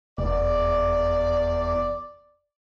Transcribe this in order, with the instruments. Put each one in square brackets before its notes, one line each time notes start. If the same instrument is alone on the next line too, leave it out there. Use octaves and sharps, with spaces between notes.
[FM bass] F1 [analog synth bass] E2 [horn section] D5